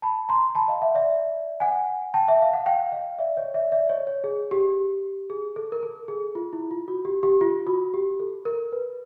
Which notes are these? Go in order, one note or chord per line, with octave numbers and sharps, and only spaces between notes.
A5 B5
A#5 C6
A5 B5
D#5 F5
E5 F#5
D5 E5
F#5 G#5
G5 A5
E5
F5
F#5
F5 G5
D#5 F5
D5 E5
C#5 D#5
D5 E5
D5 E5
C#5 D#5
C#5
G#4
G4
G#4
A4
A#4
A4
G#4
F4
E4
F4
F#4
G4
G4
F4
F#4
G4
A4
A#4
B4